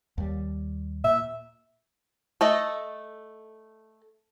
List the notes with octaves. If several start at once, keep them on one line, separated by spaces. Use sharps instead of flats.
D#2 G3
A#2 E5
A3 A4 D#5